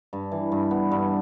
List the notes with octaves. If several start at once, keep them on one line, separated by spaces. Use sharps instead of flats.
G2
E3
G2
B3
G2